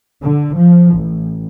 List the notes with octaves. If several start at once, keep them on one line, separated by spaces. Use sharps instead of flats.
D3
F3
A1